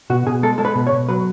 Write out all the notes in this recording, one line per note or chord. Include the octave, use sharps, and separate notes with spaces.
B2 F#4
B2 G#4
G#3 A4
G#3 A4
B4
B2
C#5
B2
F#3 B4